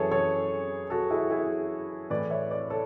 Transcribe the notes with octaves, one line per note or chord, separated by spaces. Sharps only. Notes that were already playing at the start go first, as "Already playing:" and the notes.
Already playing: F#2 E3 E4 G#4 A4 C#5
A4 C#5
F#4 A4
E4 G#4
E4 G#4
A2 E3 B4 D5
C#5 E5
B4 D5
A4 C#5